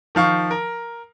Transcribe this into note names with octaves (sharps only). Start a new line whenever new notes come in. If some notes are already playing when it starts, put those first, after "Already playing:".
D#3 F3 F5 C#6
A#4